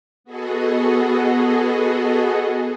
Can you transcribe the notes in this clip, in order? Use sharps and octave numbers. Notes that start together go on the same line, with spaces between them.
B3 F#4 G#4 A4 D#5